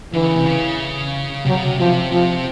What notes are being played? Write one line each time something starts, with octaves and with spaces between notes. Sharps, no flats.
D3 E3
C#3
C3
C#3
C3 F#3
C#3
C3
C3 F3
C3 F3